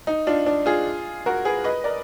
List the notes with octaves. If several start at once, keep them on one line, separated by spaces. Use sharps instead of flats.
D#4
D4 F4
D4
F4 G#4
F#4 A#4
G#4 B4
B4 D#5
A#4 D5